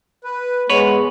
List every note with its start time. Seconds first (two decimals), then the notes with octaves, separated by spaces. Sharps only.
0.24 B4
0.70 G#3 B3 B4 C#5